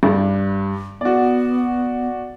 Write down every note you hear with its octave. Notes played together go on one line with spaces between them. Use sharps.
G2
B3 F#4 D5